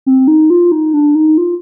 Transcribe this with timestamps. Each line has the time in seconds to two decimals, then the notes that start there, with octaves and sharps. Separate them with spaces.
0.06 C4
0.28 D#4
0.50 F4
0.72 D#4
0.94 D4
1.15 D#4
1.38 F4